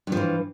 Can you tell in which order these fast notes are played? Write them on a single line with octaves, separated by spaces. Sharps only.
G2 F3 E3